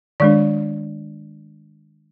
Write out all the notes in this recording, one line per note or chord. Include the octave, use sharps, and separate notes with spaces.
D#3 G#3 D4 D5